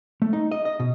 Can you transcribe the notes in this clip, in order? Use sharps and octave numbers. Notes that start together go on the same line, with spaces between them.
A3
D#4
D#5
D#5
B2